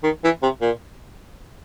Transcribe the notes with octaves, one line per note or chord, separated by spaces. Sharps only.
D#3
E3
C3
A#2